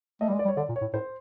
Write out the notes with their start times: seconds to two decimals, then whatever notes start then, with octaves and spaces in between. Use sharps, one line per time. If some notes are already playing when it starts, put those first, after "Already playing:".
0.21 A3 D#5
0.29 G3 D5
0.34 G#3
0.39 D5
0.45 G3
0.48 C#5
0.57 D3 D5
0.69 A#2
0.76 C#5
0.82 A2
0.93 A2 C5